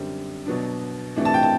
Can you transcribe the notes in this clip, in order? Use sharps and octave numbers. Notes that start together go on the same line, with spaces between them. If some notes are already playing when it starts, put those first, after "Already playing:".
Already playing: F#2 D3 G3 C4
B2 F#3 B3 D4
C3 E3 A3 D4
A5
G5
A5